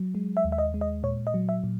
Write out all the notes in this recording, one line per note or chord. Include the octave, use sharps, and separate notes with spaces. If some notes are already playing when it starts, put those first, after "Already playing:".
Already playing: F#3
G#3
E5
D#2
E5
D#5
G#3
D#5
A#2 C#5
D#5
F#3
E5
A#2